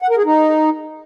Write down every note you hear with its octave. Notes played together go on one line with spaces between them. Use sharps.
F#5
A#4
G#4
D#4